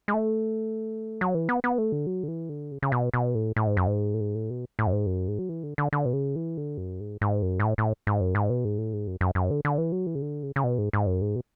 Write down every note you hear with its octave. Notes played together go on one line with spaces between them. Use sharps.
G#3
A3
F#3
E3
B3
B3
A3
D3
F#3
D3
E3
D3
C#3
C#3
B2
B2
A2
A2
G#2
F#2
G#2
A2
G#2
A2
B2
A2
F#2
G#2
F#2
G#2
F#3
E3
D3
D3
D3
B2
C#3
E3
D3
F#2
G#2
G#2
F#2
G#2
A2
A2
G#2
F#2
G#2
B2
G#2
A2
G#2
F#2
F#2
F#2
D3
D3
E3
F#3
E3
C#3
D3
C#3
C#3
B2
G#2
G#2
F#2
G#2
B2